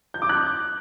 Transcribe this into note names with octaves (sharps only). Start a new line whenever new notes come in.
G6
D6
F#6